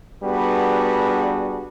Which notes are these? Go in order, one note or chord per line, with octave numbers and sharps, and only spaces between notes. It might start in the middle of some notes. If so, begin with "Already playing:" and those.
G3 B3 D4 F#4 G#4 B4